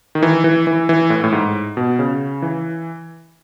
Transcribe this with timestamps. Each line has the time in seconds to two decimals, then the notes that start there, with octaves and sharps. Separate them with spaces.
0.15 D#3
0.23 E3
0.44 E3
0.67 E3
0.89 E3
1.10 A2
1.24 A2
1.32 G#2
1.77 B2
1.99 C#3
2.42 E3